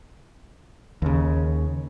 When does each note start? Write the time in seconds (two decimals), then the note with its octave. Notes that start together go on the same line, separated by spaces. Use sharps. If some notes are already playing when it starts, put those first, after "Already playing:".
1.02 D#2 C#3